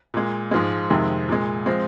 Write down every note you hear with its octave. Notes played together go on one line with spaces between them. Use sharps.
A#2 G#3
G#2 F3 G#3
F2 C3 D#3 G#3
A#2 G#3
F3 G#3 C4